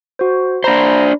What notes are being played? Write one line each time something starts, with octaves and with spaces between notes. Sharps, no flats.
F#4 C5
D4 C5 A#5 B5 A#6